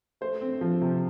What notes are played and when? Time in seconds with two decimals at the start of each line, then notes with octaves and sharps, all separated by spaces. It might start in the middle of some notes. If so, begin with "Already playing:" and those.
0.21 A3 C5
0.41 C4
0.61 F3
0.82 C3